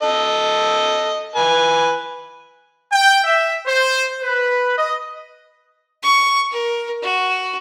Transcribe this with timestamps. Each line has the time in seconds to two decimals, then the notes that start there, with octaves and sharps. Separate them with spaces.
0.03 A4 D#5
1.36 B4 G#5
2.92 G5
3.24 E5
3.66 C5
4.22 B4
4.77 D#5
6.02 C#6
6.51 A#4
7.02 F#4